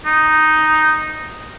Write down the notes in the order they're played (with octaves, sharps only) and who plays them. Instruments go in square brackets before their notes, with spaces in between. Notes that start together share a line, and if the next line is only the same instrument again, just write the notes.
[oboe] D#4